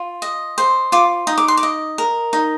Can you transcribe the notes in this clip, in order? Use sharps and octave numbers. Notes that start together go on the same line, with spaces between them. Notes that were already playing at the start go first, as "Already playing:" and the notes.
Already playing: F4
D#5
C5
F4 D6
D#4 D#6
D6
C6
D6
D#5
A#4
D#4